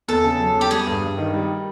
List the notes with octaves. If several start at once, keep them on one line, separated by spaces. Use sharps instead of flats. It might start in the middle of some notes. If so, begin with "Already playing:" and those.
E2 A4
C#3
F#3
E2
G4
G3 G#4
G2
G2
D#3
G3